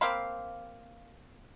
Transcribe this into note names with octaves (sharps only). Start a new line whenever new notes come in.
A#3 C4 F5 B5